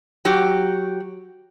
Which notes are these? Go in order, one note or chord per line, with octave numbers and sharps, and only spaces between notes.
F#3 F#4 G4